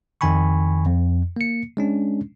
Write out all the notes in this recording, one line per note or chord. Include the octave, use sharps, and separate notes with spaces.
F2 D#3 G5 G#5 B5 C#6
F2
A#3 C#7
G#3 C#4 D4